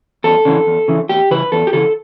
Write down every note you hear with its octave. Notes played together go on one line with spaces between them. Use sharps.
E2 A4
C#3 E3
E2
C#3 E3
E2 G4
C#3 E3 B4
E2 A4
G4
C#3 E3 A4